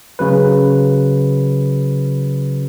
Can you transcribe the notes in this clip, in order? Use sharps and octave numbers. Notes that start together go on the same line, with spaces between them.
C#3 F#3 B4